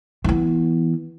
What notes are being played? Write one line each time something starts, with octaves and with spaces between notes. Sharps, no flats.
E3 B3